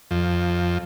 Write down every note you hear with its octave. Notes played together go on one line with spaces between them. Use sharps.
F2